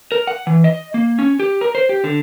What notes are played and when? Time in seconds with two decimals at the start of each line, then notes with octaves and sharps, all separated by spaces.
0.12 A#4
0.27 F#5
0.47 E3
0.64 D#5
0.94 A#3
1.19 C#4
1.40 G4
1.61 A#4
1.75 C5
1.89 G4
2.04 D3